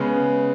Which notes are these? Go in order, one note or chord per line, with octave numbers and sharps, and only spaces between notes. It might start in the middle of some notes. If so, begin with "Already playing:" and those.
Already playing: C#3 G#3 B3